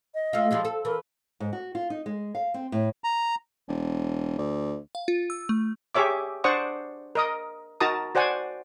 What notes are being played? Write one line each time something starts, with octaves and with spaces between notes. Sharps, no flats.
D#5
A3 F4
F3 G3 G#3
A4
E3 A#4
G#2
F#4
F4
D#4
G#3
F5
C4
A2
A#5
E1
D2
F5
F4
E6
A3
G4 G#4 C#5 E5 D6
D4 C5 D5 F#5 C#6 D#6
A#4 D#5 D#6
D#4 F#4 A#4 A5 A#5 D#6
F#4 C5 D5 F#5 G#5